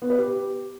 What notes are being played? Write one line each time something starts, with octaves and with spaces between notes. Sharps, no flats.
B3
B4
G4